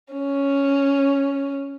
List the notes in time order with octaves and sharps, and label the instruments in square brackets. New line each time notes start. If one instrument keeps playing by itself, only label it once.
[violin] C#4